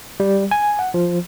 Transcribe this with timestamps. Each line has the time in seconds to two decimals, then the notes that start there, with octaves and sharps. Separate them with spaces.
0.20 G3
0.51 G#5
0.79 F#5
0.94 F3